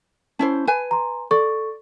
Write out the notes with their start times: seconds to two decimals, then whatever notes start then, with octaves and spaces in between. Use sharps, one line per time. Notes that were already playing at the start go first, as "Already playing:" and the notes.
0.39 C#4 E4 C5 A5
0.67 B4 G#5
0.91 A#5 C6
1.31 A4 D5 C#6